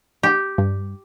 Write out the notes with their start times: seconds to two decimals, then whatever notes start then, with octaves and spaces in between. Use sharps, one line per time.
0.23 G4
0.58 G2